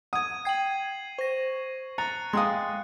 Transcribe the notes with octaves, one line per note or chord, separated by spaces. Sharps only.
F#5 D#6 G#6 D#7
G5 G#6 C7 F#7
C5 C#6 A#6
A#5 F#6 A6 C#7
G#3 F5 G5 C6 D#6